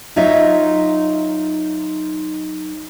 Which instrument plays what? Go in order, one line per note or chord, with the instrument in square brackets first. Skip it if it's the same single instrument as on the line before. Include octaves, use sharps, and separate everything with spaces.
[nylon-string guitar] F#3 D#4 F4 C#5 D#5 E5